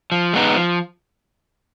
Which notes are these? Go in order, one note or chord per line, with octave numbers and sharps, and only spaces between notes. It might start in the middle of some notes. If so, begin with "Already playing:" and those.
F3
G#3 B3 D#4
F3